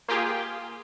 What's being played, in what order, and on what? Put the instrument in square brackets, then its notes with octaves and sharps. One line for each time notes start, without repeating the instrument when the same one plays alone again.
[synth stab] A#3 F4 G4 G#4